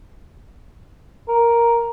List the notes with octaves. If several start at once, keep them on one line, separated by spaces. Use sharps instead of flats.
A#4